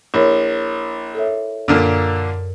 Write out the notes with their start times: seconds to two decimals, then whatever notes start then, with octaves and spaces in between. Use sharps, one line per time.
0.14 A#1 E4 A#4 C#5
1.15 A4 C#5 E5
1.68 F#2 A#2 D3 A#3 A#4